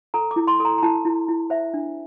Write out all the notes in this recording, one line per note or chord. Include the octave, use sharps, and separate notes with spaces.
A4 A#5
D6
E4
C6
A4
A#5
A#5
E4 A5
E4
E4
C5 E5
D4